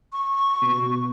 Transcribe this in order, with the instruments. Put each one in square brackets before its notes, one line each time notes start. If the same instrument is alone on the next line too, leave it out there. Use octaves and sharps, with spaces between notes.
[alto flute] C#6
[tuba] B2